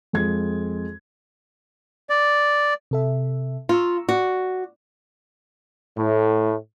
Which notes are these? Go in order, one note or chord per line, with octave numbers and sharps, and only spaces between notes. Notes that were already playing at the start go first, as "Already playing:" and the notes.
F2 G#3 G#6
D5
C3 A4 E5
F4 A#5 C#6 E6
F#4 D5
A2